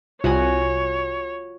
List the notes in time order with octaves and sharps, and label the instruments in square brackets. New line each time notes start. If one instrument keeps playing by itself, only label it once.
[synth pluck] C2 [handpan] F4 [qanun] F#4 F#5 G#5 [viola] C#5